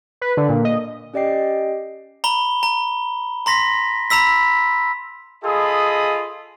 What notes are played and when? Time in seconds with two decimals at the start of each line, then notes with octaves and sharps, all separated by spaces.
0.21 B4
0.37 D3
0.49 A#2
0.65 D#5
1.14 C#4 G4 D5 D#5 G5 C7
2.24 A#5 B5 G7
2.63 A#5
3.46 A#5 C6 A#6 B6
4.10 A#5 B5 E6 B6
5.44 F4 G#4 A4 D#5 B5 D#6